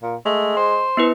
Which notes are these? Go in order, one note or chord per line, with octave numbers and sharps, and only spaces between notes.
A#2
G#3 A3
C5
B3 E4 B4